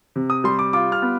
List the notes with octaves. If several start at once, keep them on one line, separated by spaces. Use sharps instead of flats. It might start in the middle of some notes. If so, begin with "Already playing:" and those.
C3
D#6
G3 C6
D6
F4 D6
F6
B3